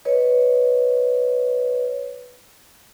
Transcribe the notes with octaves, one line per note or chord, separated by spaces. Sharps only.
B4 C#5 D#5